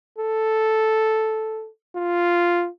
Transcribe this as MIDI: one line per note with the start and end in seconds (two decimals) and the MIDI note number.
0.18 1.69 69
1.96 2.68 65